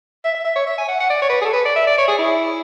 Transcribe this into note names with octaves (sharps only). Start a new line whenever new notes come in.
E5
E5
E5
C#5
E5
G#5
F#5
F#5
D5
C#5
B4
G#4
A4
B4
D5
E5
D5
C#5
G#4
E4